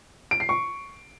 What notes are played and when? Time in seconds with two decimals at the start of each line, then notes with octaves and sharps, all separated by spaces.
0.31 D7
0.40 C7
0.49 C#6